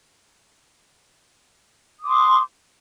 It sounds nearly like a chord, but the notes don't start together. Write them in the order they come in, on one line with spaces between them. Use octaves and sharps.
D#6 D6 C6